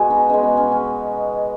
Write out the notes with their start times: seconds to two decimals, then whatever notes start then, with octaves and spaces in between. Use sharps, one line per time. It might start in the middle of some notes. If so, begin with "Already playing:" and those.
Already playing: B2 G#3 F#4 G#4
0.10 B3 D#4
0.29 B2 G#3 C#4
0.43 B3
0.57 C#4
0.72 C#4